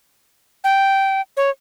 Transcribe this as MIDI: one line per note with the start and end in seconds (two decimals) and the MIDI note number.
0.64 1.21 79
1.37 1.50 73